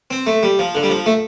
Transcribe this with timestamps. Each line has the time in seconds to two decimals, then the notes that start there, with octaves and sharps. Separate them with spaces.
0.11 C4
0.27 A3
0.43 G3
0.59 F3
0.75 D3
0.83 G3
0.90 F3
1.06 A3